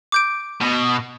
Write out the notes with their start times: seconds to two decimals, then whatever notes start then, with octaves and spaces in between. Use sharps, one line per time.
0.12 D6 G6 D7
0.61 B2